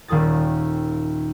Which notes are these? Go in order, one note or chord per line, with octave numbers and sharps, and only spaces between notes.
D#1 D#2 G#4 D#6 A6